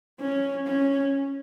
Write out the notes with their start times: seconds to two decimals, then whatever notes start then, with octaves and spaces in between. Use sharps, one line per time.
0.21 C#4
0.66 C#4